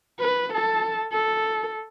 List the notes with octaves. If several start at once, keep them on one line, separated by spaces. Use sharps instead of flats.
B4
A4 A5
A4